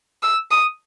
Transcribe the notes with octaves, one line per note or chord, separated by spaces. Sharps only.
E6
D#6